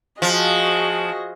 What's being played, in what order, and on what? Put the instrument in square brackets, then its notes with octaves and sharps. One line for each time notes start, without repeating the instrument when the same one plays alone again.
[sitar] F3 [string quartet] F#4 G#4 D#5